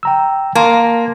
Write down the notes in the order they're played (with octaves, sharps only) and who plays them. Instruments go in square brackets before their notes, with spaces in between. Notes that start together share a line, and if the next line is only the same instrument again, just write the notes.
[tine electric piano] G5 A#5 E6
[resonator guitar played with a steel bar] A#3 [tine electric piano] A5 A#5 C6